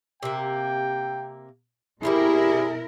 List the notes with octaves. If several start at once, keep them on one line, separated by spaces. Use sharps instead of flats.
C3 A#3 G5
B2 G3 G#3 C4 E4 G#4 A#4